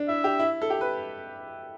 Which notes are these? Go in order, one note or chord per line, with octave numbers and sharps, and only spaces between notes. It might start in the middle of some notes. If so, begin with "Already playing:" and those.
Already playing: D4
E4 E5
G4
E4
A4
G4
B4